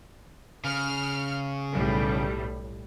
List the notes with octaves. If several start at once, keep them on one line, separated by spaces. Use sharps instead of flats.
C#3 F6
B1 A2 G3